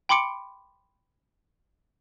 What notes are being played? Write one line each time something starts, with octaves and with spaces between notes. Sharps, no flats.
G5 B5 C6 D6 C#7 D7